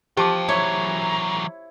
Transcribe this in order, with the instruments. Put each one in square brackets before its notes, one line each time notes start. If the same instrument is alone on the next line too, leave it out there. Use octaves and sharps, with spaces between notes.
[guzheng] F3 [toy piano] G4 A5 D6 [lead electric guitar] F5 G5
[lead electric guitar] E3 F#3 [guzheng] E4 C#5 [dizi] A#5